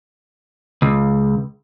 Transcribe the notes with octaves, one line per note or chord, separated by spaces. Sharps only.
C#2